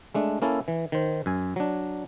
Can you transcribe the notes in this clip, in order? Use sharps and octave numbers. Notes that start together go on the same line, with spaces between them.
G#3 A3 D4
A#3 C#4 E4 A4
E3
D#3 C5
F#2 G#5
F#3 D4